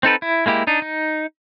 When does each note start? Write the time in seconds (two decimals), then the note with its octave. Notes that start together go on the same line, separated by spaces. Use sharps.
0.03 C4 D#4 A4 B4
0.22 E4
0.46 G#3 A#3 E4 G4
0.67 D4 D#4
0.82 D#4